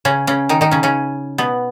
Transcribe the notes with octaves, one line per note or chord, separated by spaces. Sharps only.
C#3 C#4
C#3 C#4
D#3 D#4
D#3 D#4
C#3 C#4
C#3 C#4
B2 B3